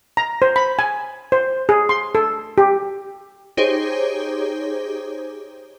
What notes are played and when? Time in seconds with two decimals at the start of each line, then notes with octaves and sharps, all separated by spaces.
0.17 A#5
0.42 C5
0.56 B5
0.79 G#5
1.32 C5
1.69 G#4
1.89 C6
2.15 A4
2.58 G4
3.57 D#4 G4 G#4 C5 C#5